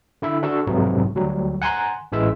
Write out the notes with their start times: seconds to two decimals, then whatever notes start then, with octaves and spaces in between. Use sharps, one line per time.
0.22 D3 E4 E5
0.43 D4 F#4 A4 E6
0.67 B1 F2 G#2 C3 F#3 B3
1.15 D2 F#3 G3
1.62 F#5 G#5 A#5 C6 F#6
2.12 A1 E3 G#3 E5 E6